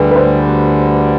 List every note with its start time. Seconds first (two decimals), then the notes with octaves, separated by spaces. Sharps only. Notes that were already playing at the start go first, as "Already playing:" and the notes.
Already playing: D2 D3 G3 G#4 B4
0.11 B4
0.16 C5